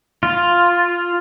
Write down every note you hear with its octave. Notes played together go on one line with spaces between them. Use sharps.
F4